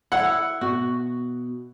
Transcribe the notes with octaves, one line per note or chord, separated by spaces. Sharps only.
E4 F#5
B2 F#4